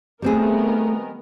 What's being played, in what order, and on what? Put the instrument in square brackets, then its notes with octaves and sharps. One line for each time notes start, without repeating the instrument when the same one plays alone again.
[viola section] D#3 B3 A#4 [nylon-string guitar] G3 C4 G#4 [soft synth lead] A3